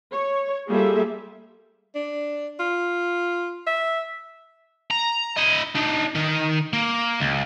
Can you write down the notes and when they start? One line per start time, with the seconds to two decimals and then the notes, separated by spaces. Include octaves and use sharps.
0.13 C#5
0.68 G3 A#3 F4 G#4 A4 E5
1.95 D4
2.60 F4
3.67 E5
4.91 A#5
5.37 E4 D#5
5.75 D4 D#4
6.15 D#3 D#4
6.73 A#3
7.20 C#2